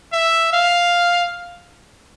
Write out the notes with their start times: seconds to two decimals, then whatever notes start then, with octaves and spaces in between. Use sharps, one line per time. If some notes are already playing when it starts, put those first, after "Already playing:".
0.13 E5
0.53 F5